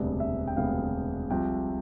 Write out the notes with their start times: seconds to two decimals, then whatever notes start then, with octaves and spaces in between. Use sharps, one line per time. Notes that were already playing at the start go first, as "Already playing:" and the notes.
Already playing: E1 D2 C3 G3 B3 D5
0.20 E5
0.47 G5
0.57 E1 D2 C3 G3 B3 F5
1.30 C2 C3 F3 G5